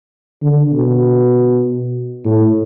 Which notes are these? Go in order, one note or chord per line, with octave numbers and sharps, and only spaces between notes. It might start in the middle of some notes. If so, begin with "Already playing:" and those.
D3
B2
A2